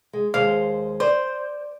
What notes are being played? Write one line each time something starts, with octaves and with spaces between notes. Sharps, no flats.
G#3
D#2 G#3 C5 F5
C5 D5